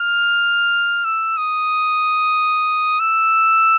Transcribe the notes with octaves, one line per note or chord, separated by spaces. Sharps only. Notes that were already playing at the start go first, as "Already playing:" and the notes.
Already playing: F6
E6
D#6
E6